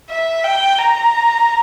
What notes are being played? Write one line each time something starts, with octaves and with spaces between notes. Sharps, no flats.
E5
G5
A#5